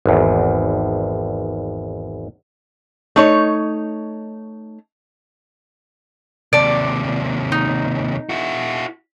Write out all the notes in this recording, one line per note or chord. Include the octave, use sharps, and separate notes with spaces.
G#1 E2
A3 D#4 C#5
D#2 C3 D5 A5
D#4
E4 F#4